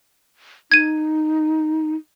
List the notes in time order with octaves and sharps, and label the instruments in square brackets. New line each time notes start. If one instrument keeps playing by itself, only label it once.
[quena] D#4 [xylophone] G#6 D#7